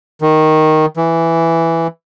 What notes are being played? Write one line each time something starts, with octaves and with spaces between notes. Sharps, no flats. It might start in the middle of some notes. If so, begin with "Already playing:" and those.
D#3
E3